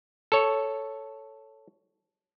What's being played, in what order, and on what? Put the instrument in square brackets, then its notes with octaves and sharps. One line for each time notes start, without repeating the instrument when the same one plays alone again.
[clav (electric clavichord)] A4 C#5